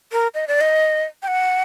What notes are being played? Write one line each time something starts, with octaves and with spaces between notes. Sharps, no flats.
A#4
D#5
D5
D#5
G5
F#5